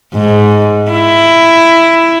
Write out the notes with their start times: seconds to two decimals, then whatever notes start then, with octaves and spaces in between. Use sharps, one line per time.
0.13 G#2
0.91 E4